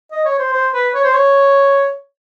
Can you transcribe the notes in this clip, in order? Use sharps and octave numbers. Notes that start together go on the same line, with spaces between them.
D#5
C#5
C5
C5
B4
C#5
C5
C#5